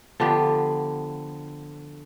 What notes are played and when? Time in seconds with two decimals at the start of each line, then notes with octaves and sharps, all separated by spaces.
0.20 D3 F3 B3 G4